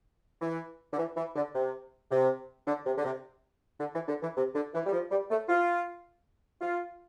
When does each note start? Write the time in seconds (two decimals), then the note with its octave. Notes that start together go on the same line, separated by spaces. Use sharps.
0.42 E3
0.92 D3
0.98 E3
1.17 E3
1.36 D3
1.54 C3
2.11 C3
2.67 D3
2.86 C3
2.97 D3
3.05 C3
3.80 D3
3.94 E3
4.08 D3
4.22 E3
4.36 C3
4.54 D3
4.74 E3
4.86 G3
4.92 F3
5.11 G3
5.31 A3
5.49 F4
6.61 F4